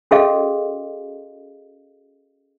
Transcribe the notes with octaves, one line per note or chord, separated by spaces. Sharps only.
C#4 F#4 G#4 A4 D#5 F5